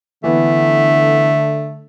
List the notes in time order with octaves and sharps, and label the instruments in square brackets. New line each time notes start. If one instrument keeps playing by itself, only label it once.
[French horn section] D3 [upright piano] E3 B3 [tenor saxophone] A3